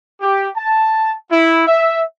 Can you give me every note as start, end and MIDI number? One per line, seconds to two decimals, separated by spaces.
0.21 0.48 67
0.56 1.13 81
1.30 1.63 64
1.67 2.01 76